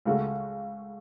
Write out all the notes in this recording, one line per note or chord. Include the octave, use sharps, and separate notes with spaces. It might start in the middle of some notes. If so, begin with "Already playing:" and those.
C#2 C#3 A3 F#4